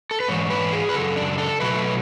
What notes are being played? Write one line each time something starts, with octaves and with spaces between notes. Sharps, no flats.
A4
B4
G#2 E3 C#5
B4
G#4
B4
F#2 C#3 A4
D4
A4
B2 F#3 A3 B4